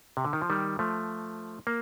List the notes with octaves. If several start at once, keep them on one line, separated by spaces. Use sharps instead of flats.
C3
D3
D#3
F3
D#3 G3
F3 A3
A#3